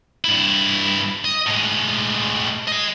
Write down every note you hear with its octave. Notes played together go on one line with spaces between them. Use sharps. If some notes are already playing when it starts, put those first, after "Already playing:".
G2 E4
D#5
A2 G#3
D#5 G#5